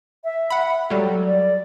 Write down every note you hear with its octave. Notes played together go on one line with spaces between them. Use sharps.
E5
F#5 B5
F#3 G3 A4
D5